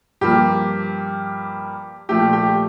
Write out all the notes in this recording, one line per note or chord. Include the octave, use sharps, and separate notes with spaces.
G2 F3 A#3 G4
A#2 F3 A3 G4
G4